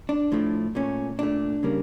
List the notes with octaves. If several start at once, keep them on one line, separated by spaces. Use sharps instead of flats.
D4
A2 F3 A3
A#2 A3 C#4
A#2 A3 D4
C#3 G3 A#3